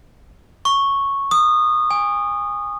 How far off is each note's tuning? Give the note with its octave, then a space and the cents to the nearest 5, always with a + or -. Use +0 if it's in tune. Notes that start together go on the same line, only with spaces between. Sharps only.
C#6 -5
D#6 -20
G#5 -25